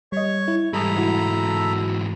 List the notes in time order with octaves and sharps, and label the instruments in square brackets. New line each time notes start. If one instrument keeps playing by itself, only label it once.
[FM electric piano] G3 D#5 [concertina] C#5 C#6
[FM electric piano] E4
[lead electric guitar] G#2 E3 [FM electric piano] G3 D#6 [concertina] A4 A#5 B5
[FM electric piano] E4 F#4